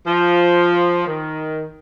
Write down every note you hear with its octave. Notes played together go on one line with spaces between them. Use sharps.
F3
D#3